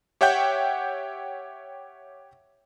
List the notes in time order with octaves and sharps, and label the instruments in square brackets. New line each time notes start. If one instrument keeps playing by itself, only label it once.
[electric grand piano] G4 C#5 E5 F#5 G5 G6